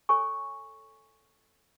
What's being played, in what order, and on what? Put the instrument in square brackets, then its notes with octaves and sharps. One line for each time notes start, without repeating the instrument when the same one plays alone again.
[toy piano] A4 C#5 G#5 C#6